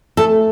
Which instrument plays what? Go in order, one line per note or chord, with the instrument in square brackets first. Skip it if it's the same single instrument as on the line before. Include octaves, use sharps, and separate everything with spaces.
[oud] A3 [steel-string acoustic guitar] A4